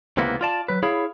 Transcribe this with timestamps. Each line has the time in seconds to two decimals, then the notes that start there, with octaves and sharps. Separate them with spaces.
0.17 C#2 C3 E3 A#3 B3
0.41 F4 D5 A5
0.68 F#3 B4
0.83 E4 G#4 C#5 F5 B5